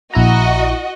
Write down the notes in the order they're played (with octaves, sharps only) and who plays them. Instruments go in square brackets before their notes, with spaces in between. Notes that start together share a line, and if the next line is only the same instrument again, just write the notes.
[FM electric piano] A#1 E4 A#5 [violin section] F#4 D#5